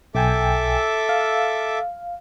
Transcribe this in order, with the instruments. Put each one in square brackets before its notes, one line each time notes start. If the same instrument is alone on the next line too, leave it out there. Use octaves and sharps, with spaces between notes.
[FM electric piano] B1 G5 G#5 [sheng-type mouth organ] A4 E5 D6
[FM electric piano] F5